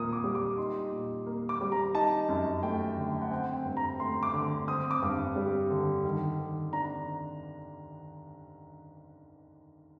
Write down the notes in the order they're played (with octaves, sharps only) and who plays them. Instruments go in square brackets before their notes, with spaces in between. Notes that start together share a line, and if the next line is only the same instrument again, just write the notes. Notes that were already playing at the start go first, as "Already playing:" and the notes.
Already playing: [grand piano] A#2 A#3 D#6
D6
G3
D6
D#4 C6
A#2
A#3
D6
G3
A#5
D#4 A5
F#2
A3 G5
D3
F#5
C4 G5
G5
G2
A#5
A3 C6
D6
D3
C4 D#6
D6
G2
G3
D3
D#3
D#3
D4 A#5